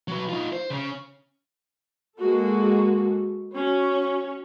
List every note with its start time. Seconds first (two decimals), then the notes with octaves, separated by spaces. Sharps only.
0.08 F#3 B4
0.29 D#4 F4
0.53 C5
0.70 C#3 C#4
2.18 G#3 A#3 F#4 A4
3.54 C#4 F#4 C#5